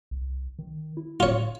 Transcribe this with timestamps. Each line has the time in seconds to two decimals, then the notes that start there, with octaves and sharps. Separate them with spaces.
0.11 C2
0.59 D#3
0.97 E4
1.20 A2 F4 C#5